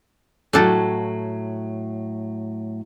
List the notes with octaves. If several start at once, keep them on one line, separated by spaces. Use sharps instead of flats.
A2 F#3 A3 D4 A4